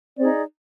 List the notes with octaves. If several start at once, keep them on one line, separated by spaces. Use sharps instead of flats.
C4 D#4 G#4 D5